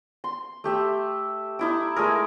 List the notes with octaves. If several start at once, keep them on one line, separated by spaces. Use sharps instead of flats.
C6
A3 G4 E5
D#4 E4 D6
G#3 A3 G#4 A#4